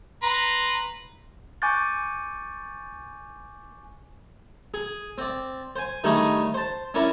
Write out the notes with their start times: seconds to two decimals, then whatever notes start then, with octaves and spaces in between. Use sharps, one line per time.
0.23 B4 A#5 C6
1.62 G#5 C#6 D6 F#6 G6 A6
4.74 G#4
5.18 C4 D5
5.76 C5 G#5
6.04 D#3 G3 A3 D4 D#4 G#4
6.54 C5 A5
6.94 C#4 D4 E4 A#4 D5